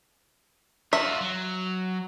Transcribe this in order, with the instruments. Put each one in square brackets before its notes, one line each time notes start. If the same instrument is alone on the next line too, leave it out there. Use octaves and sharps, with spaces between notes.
[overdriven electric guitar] F4 F#4 [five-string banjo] E5
[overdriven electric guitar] F#3